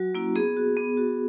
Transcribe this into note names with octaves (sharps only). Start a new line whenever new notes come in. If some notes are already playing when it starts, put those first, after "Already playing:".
Already playing: F#3 F#4
A#3 C#4 E4
B3 G#4
F#4
B3
F#4